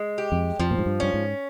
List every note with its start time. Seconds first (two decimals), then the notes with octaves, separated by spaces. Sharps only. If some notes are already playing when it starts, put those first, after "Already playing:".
Already playing: G#3
0.18 G4
0.32 F2
0.59 F2 F3
0.71 A#2
0.78 G#2
0.86 G2
1.00 G2 C#4
1.14 G#2